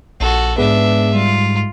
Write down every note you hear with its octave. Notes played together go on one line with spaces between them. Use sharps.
A#1 F#4 A4
G#2 B3 D4 G#4 B4 E5
G3 F4